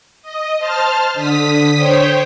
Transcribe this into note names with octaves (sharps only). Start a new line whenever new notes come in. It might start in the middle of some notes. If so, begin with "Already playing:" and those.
D#5
C5 A5 F6
D3 D#6 B6
C5 C#5 G5